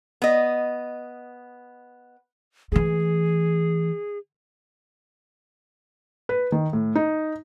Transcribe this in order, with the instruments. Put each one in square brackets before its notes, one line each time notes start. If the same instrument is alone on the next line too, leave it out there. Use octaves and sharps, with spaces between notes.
[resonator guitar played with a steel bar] B3 D#5
[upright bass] E3 A3 [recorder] G#4
[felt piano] B4
D#3
A2
D#4